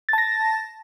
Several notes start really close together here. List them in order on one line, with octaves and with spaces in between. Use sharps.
A6 A5 A#6